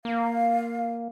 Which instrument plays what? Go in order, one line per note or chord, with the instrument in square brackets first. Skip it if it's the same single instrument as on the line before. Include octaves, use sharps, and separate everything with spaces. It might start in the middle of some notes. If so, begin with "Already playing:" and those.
[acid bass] A#3 [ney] F5